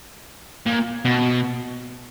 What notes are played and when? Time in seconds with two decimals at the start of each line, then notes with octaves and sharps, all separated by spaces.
0.66 A#2
1.05 B2